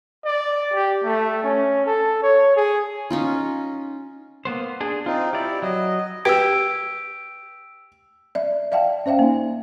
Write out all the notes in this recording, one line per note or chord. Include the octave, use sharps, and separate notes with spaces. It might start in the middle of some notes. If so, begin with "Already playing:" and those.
D5
G4
A3
C#4
A4
C#5
G#4
C#4 D#4 F4
A#3 B3 C5
D4 G#4
C4 D#4 F4
E4 G4 D5
F#3 D#5
G4 B4 E6 D7
D5 E5
D5 E5 F5 G5 A5
C#4 C5 E5 F5 G5
A#3 D#4